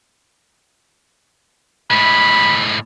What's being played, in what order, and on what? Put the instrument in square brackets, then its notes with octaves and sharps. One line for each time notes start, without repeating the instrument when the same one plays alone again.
[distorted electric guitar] A2 G#3 [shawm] B5